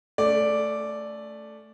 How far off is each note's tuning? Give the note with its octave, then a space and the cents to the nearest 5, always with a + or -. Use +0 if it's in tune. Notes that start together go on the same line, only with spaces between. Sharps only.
A3 +0 C#4 +30 D5 +0